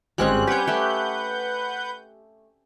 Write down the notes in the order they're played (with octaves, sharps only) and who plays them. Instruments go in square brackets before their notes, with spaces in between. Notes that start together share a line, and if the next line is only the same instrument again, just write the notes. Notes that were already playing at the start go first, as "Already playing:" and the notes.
[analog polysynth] G#1 G#3 F#6 [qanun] G3 C4 C#4
[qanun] G4 C#5 [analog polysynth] B4 F#5 G6
[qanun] A3 G4